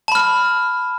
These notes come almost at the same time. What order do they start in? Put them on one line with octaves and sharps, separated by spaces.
A5 B5 F6